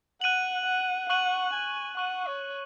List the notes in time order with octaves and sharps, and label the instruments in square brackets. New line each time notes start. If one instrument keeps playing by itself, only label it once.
[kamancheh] F#5 [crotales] F#6 D#7 F#7
[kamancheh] F#5
[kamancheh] F#5 [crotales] C#6 F#6 D#7 F#7
[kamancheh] G#5
[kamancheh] F#5 [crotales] C#6 F#6 D#7 F#7
[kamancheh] C#5